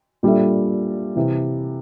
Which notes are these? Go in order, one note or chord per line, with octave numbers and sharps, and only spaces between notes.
A#2 G3 D4 A4 E5
C3 E3